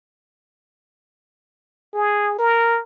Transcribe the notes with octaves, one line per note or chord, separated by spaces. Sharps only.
G#4
A#4